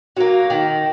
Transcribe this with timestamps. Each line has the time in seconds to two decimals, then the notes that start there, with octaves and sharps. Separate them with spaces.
0.17 F#3 A#3
0.50 D#3